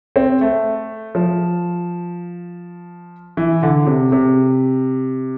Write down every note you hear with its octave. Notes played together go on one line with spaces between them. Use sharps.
C4
A3
F3
E3
D3
C3
C3